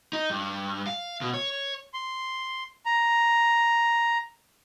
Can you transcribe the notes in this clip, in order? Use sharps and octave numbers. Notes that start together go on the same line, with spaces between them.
D#4
G2
F5
B2
C#5
C6
A#5